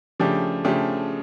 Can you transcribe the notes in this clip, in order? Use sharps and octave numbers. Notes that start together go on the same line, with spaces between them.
C#3 F3 A3 D4 G4
C#3 F3 A3 D4 G4